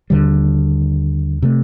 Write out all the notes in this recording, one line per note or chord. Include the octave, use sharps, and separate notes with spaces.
D#2 D3 G3
C3 F3 A3